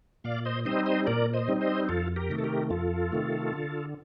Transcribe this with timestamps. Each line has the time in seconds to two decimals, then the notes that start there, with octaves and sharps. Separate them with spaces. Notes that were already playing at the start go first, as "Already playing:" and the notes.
0.24 A#2 D5 F5
0.45 C5 D#5
0.65 G3 C4 D#4 C5 D#5
0.86 C5 D#5
1.07 A#2 A#4 D5
1.34 C5 D#5
1.48 G3 C4 D#4
1.61 C5 D#5
1.89 F2 F4 A4
2.16 G4 A#4
2.30 C3 D#3 A3
2.39 A4
2.44 G4 A#4
2.70 F2 F4 A4
3.12 C3 D#3 A3
3.53 D3